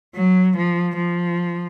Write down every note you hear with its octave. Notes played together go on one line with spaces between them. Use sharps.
F#3
F3
F3